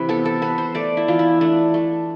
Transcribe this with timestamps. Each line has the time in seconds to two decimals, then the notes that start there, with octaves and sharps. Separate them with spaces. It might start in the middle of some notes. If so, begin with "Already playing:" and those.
Already playing: C3 E3 B4
0.09 B3 A4
0.25 A4
0.42 B3 B4
0.58 C5
0.75 A3 D5
0.97 E4
1.08 E3 F4
1.19 E4
1.41 A3 D4
1.74 A3